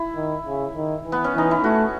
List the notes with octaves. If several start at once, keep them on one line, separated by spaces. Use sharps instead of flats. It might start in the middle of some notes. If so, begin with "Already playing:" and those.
Already playing: E4
D#3
C#3
D#3
E3
B3
C#4
E3 D#4
E4
A3 F#4